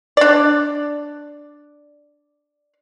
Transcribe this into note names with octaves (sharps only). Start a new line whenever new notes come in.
D4 D5